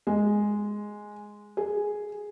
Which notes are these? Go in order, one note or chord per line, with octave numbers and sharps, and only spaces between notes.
G#3
G#4